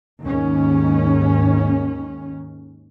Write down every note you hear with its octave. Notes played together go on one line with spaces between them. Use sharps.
D#2 G#2 D#3 C#4